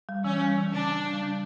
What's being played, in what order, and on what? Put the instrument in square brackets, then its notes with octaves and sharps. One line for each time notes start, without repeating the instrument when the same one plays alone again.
[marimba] G3
[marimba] E3 [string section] C#4
[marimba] G3
E3
[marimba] C#3 [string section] D4
[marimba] C#3
G3
G3